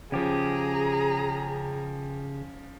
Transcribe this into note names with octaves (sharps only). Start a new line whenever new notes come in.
C#3 F3 C#4 G4 G#4 A#5